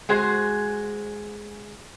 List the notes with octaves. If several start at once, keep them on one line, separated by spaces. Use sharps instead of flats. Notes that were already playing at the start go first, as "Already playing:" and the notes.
G#3 F#4 G#4 C5